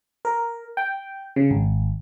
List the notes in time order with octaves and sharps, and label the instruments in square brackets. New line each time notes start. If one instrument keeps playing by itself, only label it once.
[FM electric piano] A#4
G5
C#3
G#1